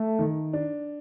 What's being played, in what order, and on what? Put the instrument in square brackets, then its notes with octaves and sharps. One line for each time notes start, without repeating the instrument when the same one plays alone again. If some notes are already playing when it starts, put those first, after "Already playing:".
Already playing: [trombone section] A3
[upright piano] D#3
D4